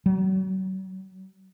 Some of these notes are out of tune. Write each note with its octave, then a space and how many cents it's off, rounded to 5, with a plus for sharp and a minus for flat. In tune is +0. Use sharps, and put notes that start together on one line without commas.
F#3 +35